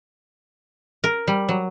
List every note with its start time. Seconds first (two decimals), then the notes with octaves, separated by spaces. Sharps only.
1.04 A#4
1.27 G3
1.49 F#3